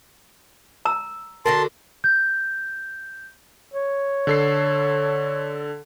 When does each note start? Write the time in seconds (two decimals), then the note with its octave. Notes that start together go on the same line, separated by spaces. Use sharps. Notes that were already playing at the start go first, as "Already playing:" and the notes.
0.85 A#5 E6
1.46 D3 F#4 A#4 A5 C6
2.04 G6
3.74 C#5
4.27 D3 A4 C7